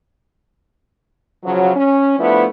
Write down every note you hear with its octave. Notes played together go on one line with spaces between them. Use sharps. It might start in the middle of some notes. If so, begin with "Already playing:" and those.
C#3 F3 F#3
C#4
F3 A3 B3 D4 E4